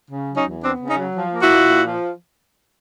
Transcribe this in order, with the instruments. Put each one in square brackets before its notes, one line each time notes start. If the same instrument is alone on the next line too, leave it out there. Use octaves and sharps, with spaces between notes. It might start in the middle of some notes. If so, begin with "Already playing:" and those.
[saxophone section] C#3
F#3
C#4 D#4
E2
B3 C4 D4
C#3
C#4 D#4
F#3
F3
A#3
E4 F#4
A#2
A#2
F3